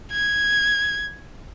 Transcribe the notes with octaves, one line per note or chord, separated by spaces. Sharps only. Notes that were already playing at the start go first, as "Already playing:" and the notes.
G#6